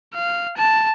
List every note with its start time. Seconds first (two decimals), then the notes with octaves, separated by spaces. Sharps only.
0.14 F5
0.57 A5